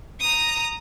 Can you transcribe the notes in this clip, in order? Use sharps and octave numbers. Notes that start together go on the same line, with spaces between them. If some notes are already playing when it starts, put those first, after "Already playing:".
A#5 D#6